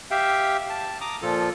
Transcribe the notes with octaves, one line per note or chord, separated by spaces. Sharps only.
G4 E5 F5 G5
A5
A#5 D6 D#6
A#2 F3 F4 A4